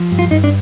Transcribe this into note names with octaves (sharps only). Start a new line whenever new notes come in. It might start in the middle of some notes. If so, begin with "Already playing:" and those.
Already playing: F3
G2
F4
G2 D#4
D4